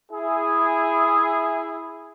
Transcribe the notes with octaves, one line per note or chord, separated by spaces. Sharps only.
E4 G#4